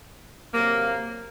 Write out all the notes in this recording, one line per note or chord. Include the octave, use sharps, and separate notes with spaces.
C3 F#3 A#3